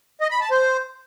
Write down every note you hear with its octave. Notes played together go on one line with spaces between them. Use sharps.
D#5
B5
A5
C5